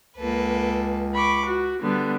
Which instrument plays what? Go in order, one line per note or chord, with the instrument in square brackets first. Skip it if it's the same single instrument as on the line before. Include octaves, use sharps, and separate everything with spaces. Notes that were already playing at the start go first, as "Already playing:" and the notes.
[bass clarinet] C#2 [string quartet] A#3 A4 B4
[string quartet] B5 C#6 D6
F#4
D3 G3 B3